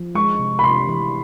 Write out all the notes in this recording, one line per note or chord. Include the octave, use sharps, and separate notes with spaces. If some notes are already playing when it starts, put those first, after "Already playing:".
Already playing: F3
G#3 C#6
C3
B5
C3 C6
E3